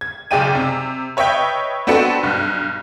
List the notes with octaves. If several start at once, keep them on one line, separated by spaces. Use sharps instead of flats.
G#6
F#1 B1 G#4 D5 G5 D#7
C3
B4 C#5 D#5 E5 G5 G6
B3 C4 D4 F#4 A4 B4
B1 G2